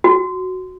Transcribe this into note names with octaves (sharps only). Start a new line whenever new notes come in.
F#4